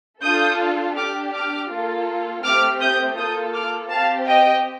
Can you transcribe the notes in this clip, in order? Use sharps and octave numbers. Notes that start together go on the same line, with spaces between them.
D4 F4 A4 D#6 G6
D4 G4 D6 F6
D6 F6
A#3 F4 A4
A3 C4 G4 D6 F6
D#6 G6
A#3 F4 A4 D#6 G6
D6 F6
C4 G4 F5 A5
D#5 G5